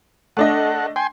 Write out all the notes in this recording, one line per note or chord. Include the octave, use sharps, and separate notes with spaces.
A3 D4 A4 D#5 F#5
G5 G#5 C6